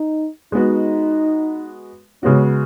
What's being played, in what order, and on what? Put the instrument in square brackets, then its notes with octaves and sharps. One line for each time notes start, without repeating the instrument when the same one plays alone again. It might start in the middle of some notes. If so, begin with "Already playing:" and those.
Already playing: [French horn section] D#4
[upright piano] G#3 B3 F#4 [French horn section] D#4
[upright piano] C#3 G#3 B3 F#4 [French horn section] C#4